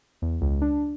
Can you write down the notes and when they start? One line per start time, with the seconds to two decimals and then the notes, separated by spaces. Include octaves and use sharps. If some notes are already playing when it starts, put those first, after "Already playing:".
0.22 E2
0.41 C#2
0.62 D4